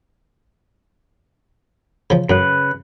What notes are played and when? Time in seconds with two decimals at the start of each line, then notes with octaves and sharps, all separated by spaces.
2.10 C#3 F3
2.30 F#2 C#3 B4